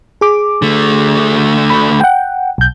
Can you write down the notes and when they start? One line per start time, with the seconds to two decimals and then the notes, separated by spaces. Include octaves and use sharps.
0.21 G#4 D6
0.62 D3 A3
1.70 B5
2.01 F#5 G5
2.58 B1 G6